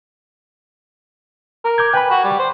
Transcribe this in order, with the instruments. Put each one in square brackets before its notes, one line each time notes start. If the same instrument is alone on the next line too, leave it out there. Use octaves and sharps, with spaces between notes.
[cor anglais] A#4
[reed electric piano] D6 G6 G#6
[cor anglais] B4 [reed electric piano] G5 G#5 B5
[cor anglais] F#4
G3
C5